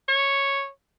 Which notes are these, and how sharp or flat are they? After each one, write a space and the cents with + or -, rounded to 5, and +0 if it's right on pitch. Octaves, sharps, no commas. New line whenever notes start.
C#5 -5